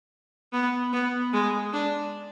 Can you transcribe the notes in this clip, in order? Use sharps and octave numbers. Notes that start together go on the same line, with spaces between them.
B3
B3
G#3
D4